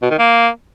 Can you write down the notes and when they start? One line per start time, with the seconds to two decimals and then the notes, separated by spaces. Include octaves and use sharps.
0.02 B2
0.10 D#3
0.19 A#3